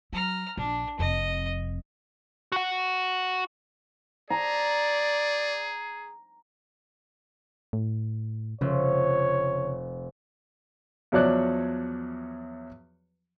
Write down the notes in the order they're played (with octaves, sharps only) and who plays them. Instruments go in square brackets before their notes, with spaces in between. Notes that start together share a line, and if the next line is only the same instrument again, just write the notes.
[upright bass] F#3 [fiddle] A#5 F6
[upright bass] A#1 [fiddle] D4
[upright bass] F1 F2 [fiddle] D#5
[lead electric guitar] F#4 F#5
[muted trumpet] G#4 [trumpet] D5 [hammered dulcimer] A#5
[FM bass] A2
[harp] F1 [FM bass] C#3 [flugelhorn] C#5
[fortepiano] E2 F3 F#3 C#5 D5 F#6